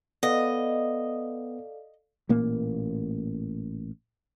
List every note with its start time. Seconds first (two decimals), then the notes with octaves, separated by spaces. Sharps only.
0.23 B3 A4 D5 D#5 F5
2.29 A1 A#2 A#3